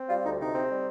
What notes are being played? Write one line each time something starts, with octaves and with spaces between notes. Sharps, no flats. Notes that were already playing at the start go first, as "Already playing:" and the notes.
Already playing: C4
G3 F4
D2 D#4
C3 D#4
C4
G3